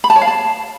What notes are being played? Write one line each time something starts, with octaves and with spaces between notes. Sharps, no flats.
B5
A5
C#5
F5
A5